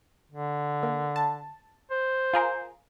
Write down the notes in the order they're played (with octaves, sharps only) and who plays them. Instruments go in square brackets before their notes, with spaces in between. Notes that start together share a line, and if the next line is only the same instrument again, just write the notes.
[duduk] D3
[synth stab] A#3
A5
[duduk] C5
[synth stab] F4 G#4 A#4